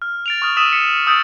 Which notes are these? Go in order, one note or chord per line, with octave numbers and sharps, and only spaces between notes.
F6
A6 D7 F7
C#6 D#6 F6
D#6 E6 B6 D#7 E7
B6 C#7
D#6 E6 G6 A6 B6 D7